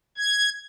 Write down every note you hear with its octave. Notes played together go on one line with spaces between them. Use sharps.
G#6